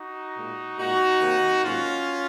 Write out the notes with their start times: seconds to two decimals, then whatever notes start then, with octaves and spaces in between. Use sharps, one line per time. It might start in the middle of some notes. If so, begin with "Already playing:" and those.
Already playing: D#4 F#4
0.36 A#2 G#3
0.78 A#2 G#3 D#4 F#4
1.21 C3 D#3 A#3
1.63 G#2 F#3 A#3 C#4 F4